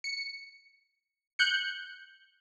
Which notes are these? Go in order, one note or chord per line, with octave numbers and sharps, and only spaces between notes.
C#7
F#6 G6 C#7